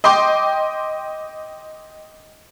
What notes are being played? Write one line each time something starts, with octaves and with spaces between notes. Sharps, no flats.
D#5 G5 C6 D6